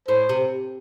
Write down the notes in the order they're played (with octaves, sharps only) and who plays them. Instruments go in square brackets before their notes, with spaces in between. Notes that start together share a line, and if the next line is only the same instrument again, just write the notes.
[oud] A2 [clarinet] C5
[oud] C3